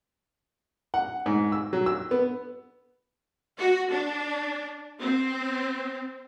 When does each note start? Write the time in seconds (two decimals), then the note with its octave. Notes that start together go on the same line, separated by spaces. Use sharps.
0.94 F#5
1.26 G#2
1.52 E6
1.73 F#3
1.86 E6
2.11 B3
3.58 F#4
3.91 D4
5.00 C4